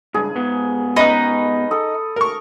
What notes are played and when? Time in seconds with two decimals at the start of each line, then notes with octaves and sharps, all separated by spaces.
0.14 C#2 G2 G#4
0.35 G#2 B3
0.96 C#4 D#4 B4 D#5 B5
1.71 A4 D#6
2.16 A#4 C#6